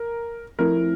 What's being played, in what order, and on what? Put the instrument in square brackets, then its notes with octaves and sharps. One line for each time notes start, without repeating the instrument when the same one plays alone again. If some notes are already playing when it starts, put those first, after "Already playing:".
Already playing: [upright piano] A#4
[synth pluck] F3 A3 C4 E4 [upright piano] A#4